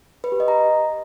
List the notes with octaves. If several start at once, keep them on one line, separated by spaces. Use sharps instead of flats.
B4
G4
D#5
A#5